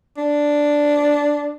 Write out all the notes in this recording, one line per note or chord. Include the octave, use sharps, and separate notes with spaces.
D4